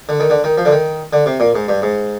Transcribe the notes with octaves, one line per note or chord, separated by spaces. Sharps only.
D3
D#3
D3
D#3
F3
D3
D#3
D3
C3
A#2
G#2
G2
G#2